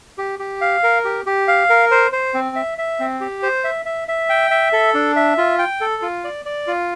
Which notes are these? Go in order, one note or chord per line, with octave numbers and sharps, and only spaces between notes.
G4
G4
F5
A#4
G4
G4
F5
A#4
C5
C5
C4
E5
E5
C4
G4
C5
E5
E5
E5
G5
E5
A4
D4
E5
F4
G5
A4
F4
D5
D5
F4